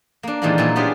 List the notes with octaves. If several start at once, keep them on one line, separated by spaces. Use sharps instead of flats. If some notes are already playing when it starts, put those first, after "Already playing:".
A#3 D4
A#2 D#3 E3 G3 G#3 A#3
A#2 F#3 G#3 D#4 E4
B3 C#4 D4 F4 G4 G#4